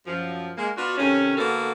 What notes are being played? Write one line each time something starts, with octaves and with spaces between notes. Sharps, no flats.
F#2 F3
G#3 A#3
B3 D4 F4 F#4
C3 D#3 A3 C#4
D3 A#3 B3 F#4 A4 A#4